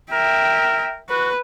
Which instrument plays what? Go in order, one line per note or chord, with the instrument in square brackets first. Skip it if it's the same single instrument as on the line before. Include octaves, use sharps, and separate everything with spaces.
[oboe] A#4 [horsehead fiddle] E5 G5
[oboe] F#4 [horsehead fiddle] B4